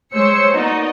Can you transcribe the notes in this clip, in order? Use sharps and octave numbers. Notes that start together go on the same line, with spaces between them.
G#3 C5 C#5 E6 C#7
A#3 B3 D#4 F#4 D5 D#5